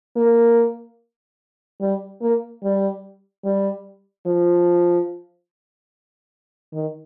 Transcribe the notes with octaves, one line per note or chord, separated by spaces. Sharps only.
A#3
G3
A#3
G3
G3
F3
D#3